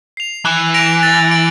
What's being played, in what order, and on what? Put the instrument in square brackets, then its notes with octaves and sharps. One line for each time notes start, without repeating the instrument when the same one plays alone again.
[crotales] C7 F7
[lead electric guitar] E3 [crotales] F#6
[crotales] A#6 D7 F7
A6
D7 F#7